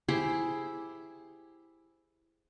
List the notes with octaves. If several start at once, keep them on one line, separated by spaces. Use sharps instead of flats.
E4 G4 G#4 C5